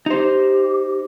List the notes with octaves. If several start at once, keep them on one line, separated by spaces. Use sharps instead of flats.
D#4 G4 C5